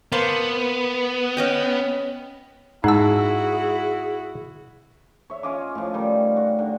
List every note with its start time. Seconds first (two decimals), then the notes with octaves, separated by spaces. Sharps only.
0.12 A#3 B3 C5 A5
1.37 C#4 D#5 G5
2.84 G#2 D#4 E4 F#4 G#4 F#5 A5 E6
5.30 C#5 E5
5.43 C#4 F4 D#5 D6
5.75 A2 F3
5.93 A2 D#3 G3
6.37 F#4
6.59 D3